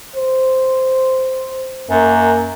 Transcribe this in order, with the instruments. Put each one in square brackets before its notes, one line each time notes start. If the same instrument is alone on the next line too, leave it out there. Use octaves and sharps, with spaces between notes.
[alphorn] C5
[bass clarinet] F#2 [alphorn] A#3